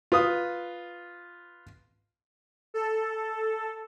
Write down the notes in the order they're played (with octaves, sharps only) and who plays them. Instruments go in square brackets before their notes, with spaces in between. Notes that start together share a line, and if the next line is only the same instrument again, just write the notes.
[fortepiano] F4 B4 D#6
[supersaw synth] A4